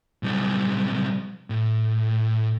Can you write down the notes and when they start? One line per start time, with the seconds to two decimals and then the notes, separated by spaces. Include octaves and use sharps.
0.23 B1 G3
1.50 A2